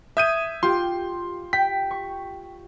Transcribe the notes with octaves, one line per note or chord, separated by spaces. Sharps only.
E5 D#6 G6 G#6 D#7
F4 G4 C6
G5 B6
C#6